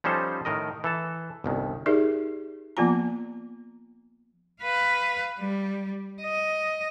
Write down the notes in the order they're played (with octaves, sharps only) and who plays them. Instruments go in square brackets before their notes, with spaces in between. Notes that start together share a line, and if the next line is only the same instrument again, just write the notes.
[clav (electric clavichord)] F3 G3 C#4 D#4 A4 C5
A2 D#3 A#4 D#5
E3 A4 A5
G1 C2 D#3
[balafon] D#4 G4 G#4 A#4 D5 E5
F3 A#3 B3 F4 G#5 A#5
[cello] B4 F5
G3
D#5